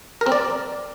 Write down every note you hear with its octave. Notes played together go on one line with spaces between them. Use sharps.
A#4
C4
D5